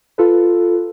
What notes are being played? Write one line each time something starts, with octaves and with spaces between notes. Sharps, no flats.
F4 A4 B4